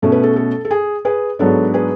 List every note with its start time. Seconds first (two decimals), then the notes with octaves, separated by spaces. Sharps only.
0.02 B2 A3 C#4 A4
0.12 B4
0.23 A4
0.36 A4
0.65 A4
0.71 G#4
1.05 G#4 B4
1.39 G#2 F#3 B3 D4 A4 C#5
1.74 G#4 B4